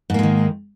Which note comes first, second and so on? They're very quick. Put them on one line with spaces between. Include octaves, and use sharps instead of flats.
G#2 A#3 G#3 D#3